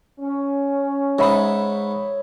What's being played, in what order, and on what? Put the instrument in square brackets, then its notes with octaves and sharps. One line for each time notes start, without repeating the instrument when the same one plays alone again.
[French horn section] C#4
[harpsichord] G#2 D#4 [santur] C#5 E5 B5